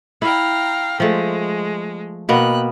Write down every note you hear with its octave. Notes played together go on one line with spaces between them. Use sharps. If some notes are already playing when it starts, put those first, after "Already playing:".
E4 F5 G5 A#5
F3 G#3 A3
B2 A#3 B3 G5 F#6